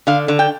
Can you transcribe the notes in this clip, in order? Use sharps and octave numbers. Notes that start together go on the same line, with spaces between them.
D3 F5
D3
G5